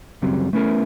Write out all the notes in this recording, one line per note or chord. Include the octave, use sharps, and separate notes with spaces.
C#2 F#2 C#3 F#3 G3 C4
A3 B3 C#4 E4 A#4